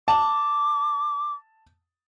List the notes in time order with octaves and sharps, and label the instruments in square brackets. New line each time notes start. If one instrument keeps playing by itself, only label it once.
[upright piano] A5 [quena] D6